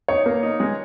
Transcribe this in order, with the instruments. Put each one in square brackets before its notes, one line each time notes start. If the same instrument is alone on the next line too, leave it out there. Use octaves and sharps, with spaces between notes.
[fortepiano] D#4 [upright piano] C#5
[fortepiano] A#3
D#4
G#3